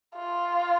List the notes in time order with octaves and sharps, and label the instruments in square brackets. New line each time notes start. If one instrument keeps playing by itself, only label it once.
[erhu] F4